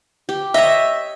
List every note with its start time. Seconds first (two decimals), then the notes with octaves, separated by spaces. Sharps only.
0.29 G4
0.54 C#5 D#5 E5